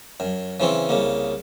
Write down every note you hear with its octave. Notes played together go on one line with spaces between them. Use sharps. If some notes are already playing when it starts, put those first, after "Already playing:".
F#2
C#3 E3 C4 C#4
C2 C#3 A#3